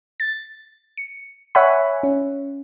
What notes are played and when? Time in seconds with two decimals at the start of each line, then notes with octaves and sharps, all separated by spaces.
0.20 A6
0.97 C#7
1.55 C#5 E5 F#5 G#5 B5
2.03 C#4